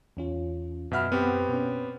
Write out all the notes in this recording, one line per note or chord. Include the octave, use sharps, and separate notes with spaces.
E2 C#4 F4
F#2 B2 E5 F#5 B5 F6
B3 C4 G4
B2 C#4